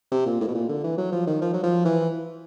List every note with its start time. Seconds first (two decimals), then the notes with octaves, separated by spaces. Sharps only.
0.12 C3
0.26 A#2
0.40 A2
0.48 B2
0.55 A#2
0.69 D3
0.84 E3
0.98 F#3
1.12 F3
1.27 D#3
1.41 F3
1.53 F#3
1.63 F3
1.85 E3